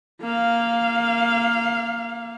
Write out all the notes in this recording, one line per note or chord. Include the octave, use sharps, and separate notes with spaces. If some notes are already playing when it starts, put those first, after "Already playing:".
A#3 F5